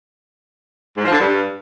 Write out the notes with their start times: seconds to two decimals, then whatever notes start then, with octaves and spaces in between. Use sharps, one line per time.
0.97 G#2
1.05 F3
1.12 D3
1.19 G2